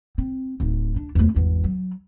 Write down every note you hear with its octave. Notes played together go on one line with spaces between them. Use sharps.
C4
D1 D#4
D4
E2 A3
G#1 E2
F#3